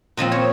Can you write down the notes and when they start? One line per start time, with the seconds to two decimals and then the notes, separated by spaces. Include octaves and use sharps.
0.17 A#2 F3 C4 D#5
0.32 C#5